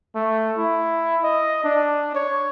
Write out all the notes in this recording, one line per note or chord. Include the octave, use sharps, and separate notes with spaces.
A3
E4
D#5
D4
C#5